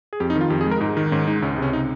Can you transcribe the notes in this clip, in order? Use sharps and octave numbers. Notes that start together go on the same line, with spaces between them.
G#4
F2 G4
D#4
D#3
F4
F2 G4
G#4
G#3 A#4
G#2 D#4
D#3 D#4
G#2 C#4
G#3 D#4
C#2 C#4
D#4
C3 C#4
D#4